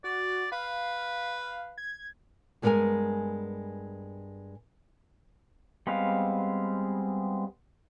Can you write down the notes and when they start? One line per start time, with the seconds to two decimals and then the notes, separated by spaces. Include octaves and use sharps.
0.04 F#4 D5
0.52 B4 F5
1.78 G#6
2.62 G2 G#3 A3 B3 A#4 G#5
5.87 G3 G#3 B3 C4 F5